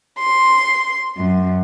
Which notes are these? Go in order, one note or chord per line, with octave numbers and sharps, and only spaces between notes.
C6
F#2